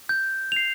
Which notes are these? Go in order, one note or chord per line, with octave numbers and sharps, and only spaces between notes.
G6
C7 F7